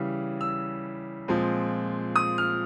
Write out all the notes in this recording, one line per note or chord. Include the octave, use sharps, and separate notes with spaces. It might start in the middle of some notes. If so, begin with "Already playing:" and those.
Already playing: C#3 E3 G3
E6
A#2 F3 G#3 C4
D#6
F6